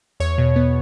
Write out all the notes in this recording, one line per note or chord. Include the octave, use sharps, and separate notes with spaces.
E2 C#5
B2
B3